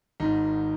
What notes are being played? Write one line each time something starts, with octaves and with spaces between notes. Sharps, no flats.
G#1 G#2 D#3 D#4